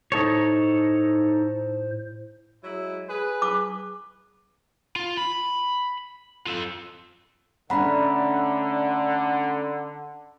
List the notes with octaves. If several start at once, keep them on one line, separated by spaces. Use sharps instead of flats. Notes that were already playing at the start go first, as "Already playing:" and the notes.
A2 D#4 A4 C5 C#5
F#3 G#3 E4
G#4 B4
D6
F4
B5
F4 A4
D3 A3 C#4 D4 F#5 A#5 B5